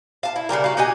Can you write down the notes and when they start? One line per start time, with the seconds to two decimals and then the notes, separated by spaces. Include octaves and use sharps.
0.23 F5 A5
0.36 E4
0.49 C#3 E3 G3 A#4
0.64 F4 F#4
0.77 F#4 G4 D#5 G#5